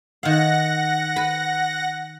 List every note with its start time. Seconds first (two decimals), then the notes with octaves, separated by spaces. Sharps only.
0.23 D#3 F5 F#5 A#6
1.16 B4